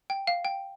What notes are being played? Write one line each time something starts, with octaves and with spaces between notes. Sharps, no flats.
G5
F5
G5